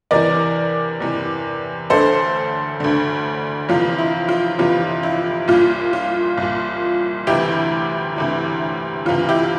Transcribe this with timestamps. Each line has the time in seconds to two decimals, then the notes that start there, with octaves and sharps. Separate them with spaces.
0.11 E2 C3 E3 A#4 D5
1.00 E2 C3 E3
1.90 D2 D3 A4 C5
2.80 D2 D3
3.69 F2 C3 E3 F4
3.98 E4
4.29 F4
4.59 F2 C3 E3 F4
5.03 E4
5.48 C2 A#2 F4
5.93 F4
6.37 C2 A#2
7.27 D2 C3 E3 E4 G4
8.16 D2 C3 E3
9.05 D2 C3 E3 F4
9.29 E4 G4